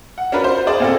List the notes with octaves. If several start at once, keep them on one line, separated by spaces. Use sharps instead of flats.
F#5
C#4 D4 F#4 A#4 B4
C5
G#4 D5
A#2 C4 A4